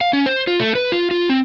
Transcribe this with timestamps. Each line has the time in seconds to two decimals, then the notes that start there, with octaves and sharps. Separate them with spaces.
0.01 F5
0.13 C#4
0.26 C5
0.47 F4
0.60 A3
0.75 B4
0.92 F4
1.11 F4
1.29 C4